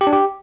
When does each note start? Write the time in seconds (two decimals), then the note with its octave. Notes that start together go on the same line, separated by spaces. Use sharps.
0.01 G4
0.07 D4
0.13 G4